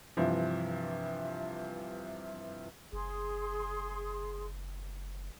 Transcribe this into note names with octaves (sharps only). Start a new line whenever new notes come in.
G2 C3 E3 F3
F#1 G#4 C6